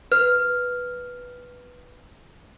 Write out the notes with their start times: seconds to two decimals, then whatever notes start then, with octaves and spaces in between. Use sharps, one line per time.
0.12 B4 F6